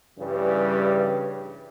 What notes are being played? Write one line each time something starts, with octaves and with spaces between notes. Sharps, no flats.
G2 C#3 E3 G3